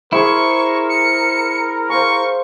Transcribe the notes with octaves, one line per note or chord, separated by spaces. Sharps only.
E4 G#4 A#4 C5 C#6
C#7
C5 F5 G#5 C#6